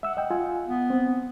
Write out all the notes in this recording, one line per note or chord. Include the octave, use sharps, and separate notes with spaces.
E5 F#5 E6
D#5 G5
F4 G#5
B3
C4